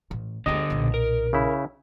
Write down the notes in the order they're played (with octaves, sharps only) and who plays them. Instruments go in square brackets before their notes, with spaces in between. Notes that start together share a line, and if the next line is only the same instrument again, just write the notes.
[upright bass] A1
[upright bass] D2 G#3 [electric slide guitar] D3 G4 G5 [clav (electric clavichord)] D#5
[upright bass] B1 A#2
[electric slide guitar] A#4
[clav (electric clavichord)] C#3 E4